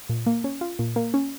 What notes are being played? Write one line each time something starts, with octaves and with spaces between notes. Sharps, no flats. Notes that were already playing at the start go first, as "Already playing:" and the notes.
A#2
A#3
C#4
F4
A#2
A#3
C#4